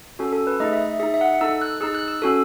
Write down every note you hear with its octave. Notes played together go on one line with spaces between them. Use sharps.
C#4 F#4 A4
A4
B4
A3 D#4 G#4 D#5
E5
D#4 G#4 E5
E5
F#5
D#4 A4 E6
F#6
D#4 G#4 E6
F#6
E6
C#4 F#4 A4